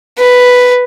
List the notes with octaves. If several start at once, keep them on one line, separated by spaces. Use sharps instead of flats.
B4